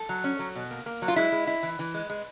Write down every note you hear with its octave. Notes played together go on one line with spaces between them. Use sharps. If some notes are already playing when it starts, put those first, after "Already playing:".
Already playing: A4
F#3
C#4
F#3
B2
A#3
A#3
F#3
F4
G#3 E4
G#3
E4
E3
E3
G#3
G#3